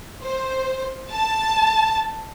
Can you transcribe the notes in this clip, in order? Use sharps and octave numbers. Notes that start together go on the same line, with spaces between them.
C5
A5